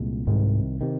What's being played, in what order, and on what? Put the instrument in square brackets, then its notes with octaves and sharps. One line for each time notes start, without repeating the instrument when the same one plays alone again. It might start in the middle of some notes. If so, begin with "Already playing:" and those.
Already playing: [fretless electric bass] C2 A#2 G#3
[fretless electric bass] C2 C3 D#3 [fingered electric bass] G#2
[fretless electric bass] C3 D#3